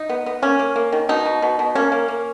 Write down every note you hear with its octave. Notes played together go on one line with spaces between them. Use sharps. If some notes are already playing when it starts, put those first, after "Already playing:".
Already playing: D#4
B3
B3
A#3 C#4
A#3
A#3
D#3
B2 D#4
B2
B2
B2
A#3 C#4
A#3
A#3